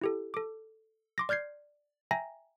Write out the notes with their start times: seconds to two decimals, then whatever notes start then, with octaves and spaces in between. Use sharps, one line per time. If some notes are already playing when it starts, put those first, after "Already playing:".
0.01 E4 G4 A4
0.34 A4 D6
1.18 C6 D6 A#6
1.29 D5 F6 G6 G#6 C7
2.11 E5 G5 G#5 A#5 A#6